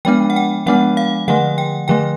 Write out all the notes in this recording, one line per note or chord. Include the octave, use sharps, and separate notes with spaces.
F3 G#3 B3 D4 G5
F#5
G5
F3 G#3 B3 D4 F#5
F5
D3 F3 A3 F#5
G5
D3 F3 A3 G5